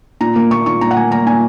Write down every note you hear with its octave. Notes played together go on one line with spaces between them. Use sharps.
A#2 A#5
A#3
A#3 C#6
A#2 C#6
A#2 A#5
F#5
A#3 G#5
A#3 A#5
A#2 G#5